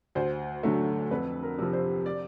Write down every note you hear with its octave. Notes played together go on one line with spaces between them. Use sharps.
D2 C5
D3 F#3 A3
F2 B4
A#4
C3 F3
C5
D5